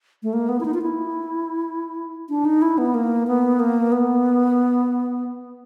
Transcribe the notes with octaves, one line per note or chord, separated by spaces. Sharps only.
A3
A#3
B3
E4
D#4
F4
E4
D4
D#4
E4
B3
A#3
B3
A#3
B3